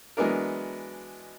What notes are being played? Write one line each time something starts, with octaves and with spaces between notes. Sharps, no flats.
E3 F#3 G#3 B3 D4 A#4